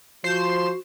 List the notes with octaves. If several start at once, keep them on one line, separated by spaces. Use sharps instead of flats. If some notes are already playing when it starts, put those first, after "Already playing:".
F3 F#4 C5 C7 E7